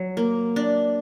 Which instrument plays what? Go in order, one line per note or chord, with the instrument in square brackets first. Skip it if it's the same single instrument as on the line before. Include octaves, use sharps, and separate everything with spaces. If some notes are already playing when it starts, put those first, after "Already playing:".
Already playing: [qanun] F#3
A#3
D4